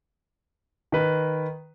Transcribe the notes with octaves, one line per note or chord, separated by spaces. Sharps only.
D#3 B4